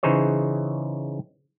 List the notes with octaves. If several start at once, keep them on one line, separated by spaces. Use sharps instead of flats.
C#3 E3 D#4 G#4 C5 C#5